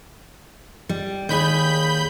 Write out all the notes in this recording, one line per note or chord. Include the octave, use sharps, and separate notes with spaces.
G3
D#2 G#4 B5 G6